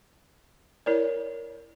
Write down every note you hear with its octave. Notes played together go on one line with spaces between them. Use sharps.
E4 A#4 C#5 D5